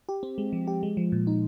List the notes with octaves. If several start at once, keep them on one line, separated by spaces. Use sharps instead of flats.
G4
C4
G#3
F3
G4
G#3
F3
A#2
D#4